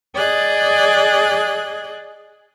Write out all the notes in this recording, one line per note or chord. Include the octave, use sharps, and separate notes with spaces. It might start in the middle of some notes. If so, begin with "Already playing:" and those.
G#4 D5 D#5 F#6 G#6